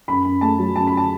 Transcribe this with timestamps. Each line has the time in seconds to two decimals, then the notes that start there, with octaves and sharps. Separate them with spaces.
0.08 F#2 B5
0.24 F#2
0.41 A3 A5
0.59 F#3
0.76 F#2 A5
0.87 B5
0.97 A5